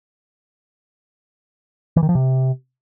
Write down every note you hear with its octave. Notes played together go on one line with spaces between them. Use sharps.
E3
D#3
F3
C3